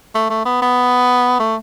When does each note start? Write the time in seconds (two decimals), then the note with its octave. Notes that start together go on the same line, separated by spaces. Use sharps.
0.15 A3
0.30 A3
0.46 B3
0.62 B3
1.40 A3